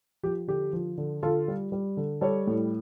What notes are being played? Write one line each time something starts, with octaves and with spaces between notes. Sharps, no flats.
F3 G4
D3 G4
F3
D3
D3 F4 A4
G3
G3
D3
G3 A4 C#5
A2